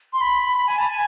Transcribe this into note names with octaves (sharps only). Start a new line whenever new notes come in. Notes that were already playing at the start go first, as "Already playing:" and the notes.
C6
B5
G#5
A5
G#5